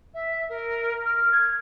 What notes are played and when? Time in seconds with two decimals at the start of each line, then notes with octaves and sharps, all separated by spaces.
0.14 E5
0.49 A#4
1.06 F6
1.32 G#6